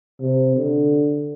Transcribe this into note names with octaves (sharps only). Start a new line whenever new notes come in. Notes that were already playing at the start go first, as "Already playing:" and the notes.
C3
D3